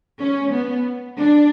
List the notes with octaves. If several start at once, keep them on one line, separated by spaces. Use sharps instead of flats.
C#4
B3
D4